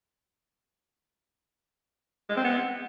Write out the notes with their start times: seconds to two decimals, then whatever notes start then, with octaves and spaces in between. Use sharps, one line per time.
2.30 G#3
2.37 C4
2.44 B3